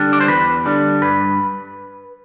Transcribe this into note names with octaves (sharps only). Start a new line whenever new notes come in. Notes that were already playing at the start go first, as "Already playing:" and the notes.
Already playing: D3 G3 D4
D5
C5
E2 B4
D3 G3 D4
G2 B4